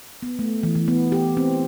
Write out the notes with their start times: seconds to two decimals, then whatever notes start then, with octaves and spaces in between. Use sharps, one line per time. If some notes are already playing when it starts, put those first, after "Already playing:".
0.22 B3
0.39 A3
0.63 E3
0.75 E3
0.88 B3
1.12 G4
1.37 C4